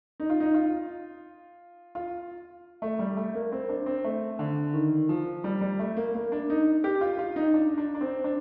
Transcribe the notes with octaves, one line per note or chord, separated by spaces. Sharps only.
D#4
F4
D#4
F4
F4
A3
G3
A3
A#3
C4
D4
C4
A3
D3
D#3
F3
G3
G3
A3
A#3
A#3
D4
D#4
G4
F4
F4
D#4
D4
D4
D4
C4
D4